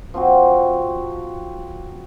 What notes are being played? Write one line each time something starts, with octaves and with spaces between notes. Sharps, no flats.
F3 C4 F#4